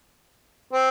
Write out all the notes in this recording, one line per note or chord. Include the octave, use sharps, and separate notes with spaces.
C4